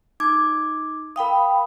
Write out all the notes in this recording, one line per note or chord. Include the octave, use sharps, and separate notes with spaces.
D#4 D6 G#6
A#4 F5 G5 B5 D#6